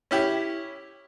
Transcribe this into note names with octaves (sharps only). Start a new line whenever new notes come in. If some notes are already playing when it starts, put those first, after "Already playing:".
C#4 E4 G4